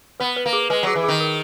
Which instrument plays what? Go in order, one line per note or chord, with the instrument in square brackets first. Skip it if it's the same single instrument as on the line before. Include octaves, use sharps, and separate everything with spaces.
[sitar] B3 [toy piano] B4
[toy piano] B4
[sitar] A#3
[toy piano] G#4
[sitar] G#3 [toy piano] B4
[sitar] F#3 [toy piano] G#4
[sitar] E3
[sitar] D#3 [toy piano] G#4
[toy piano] A#4